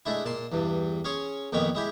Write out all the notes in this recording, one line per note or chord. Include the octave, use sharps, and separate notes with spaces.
G#3 A3 D4 E4
A#2 A5 C6
E2 G2
C#4 G#4 C#5 C6
F2 A#2 D#3 B3 C#5
G#3 E4 G4